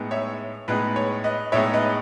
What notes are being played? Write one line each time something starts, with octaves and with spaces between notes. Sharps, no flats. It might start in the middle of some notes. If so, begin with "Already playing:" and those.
Already playing: A2 G#3 B3 D#4
C#5 E5
A2 G#3 B3 D#4 B4
C#5
B4 D#5
A2 G#3 B3 D#4 C#5 E5
B4 D#5